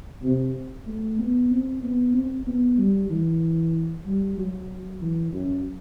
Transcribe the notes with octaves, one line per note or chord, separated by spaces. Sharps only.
C3
A3
B3
C4
B3
C4
B3
G3
E3
G3
F#3
E3
F#2